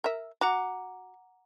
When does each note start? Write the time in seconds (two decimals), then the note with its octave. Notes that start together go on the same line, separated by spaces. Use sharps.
0.04 A#4 E5
0.41 F#4 F#5 A#5 D6